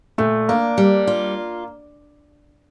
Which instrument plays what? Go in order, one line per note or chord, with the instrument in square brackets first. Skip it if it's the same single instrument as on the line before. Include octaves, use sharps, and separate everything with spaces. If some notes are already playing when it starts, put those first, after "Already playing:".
[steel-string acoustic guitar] A#2 [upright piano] A3
[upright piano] A#3 [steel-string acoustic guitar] D4
[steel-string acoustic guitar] G3
F4